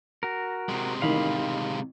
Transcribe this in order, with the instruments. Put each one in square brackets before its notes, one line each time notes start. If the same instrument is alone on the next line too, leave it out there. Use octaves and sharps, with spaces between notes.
[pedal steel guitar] F#4 A#4
[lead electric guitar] C3 G#3
[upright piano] A1 D#3 [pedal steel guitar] F5 B5